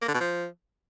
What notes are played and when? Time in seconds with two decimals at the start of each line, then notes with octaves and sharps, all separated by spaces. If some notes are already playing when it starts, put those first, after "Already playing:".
0.02 A#3
0.08 D3
0.14 B2
0.20 F3